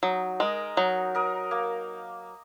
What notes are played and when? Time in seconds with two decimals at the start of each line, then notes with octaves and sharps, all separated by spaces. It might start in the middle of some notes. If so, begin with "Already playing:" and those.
0.03 F#3 D#4
0.40 G#3 A#4 D#5
0.77 F#3 D#4
1.15 A#4 D#5
1.51 A#3